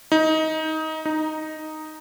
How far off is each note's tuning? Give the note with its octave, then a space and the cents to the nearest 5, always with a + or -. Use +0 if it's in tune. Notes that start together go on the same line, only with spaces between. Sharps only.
D#4 +20
D#4 +0